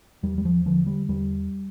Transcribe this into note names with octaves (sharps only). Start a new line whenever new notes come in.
E2 G3
G3
F3
D3 F3
G3
E2 G3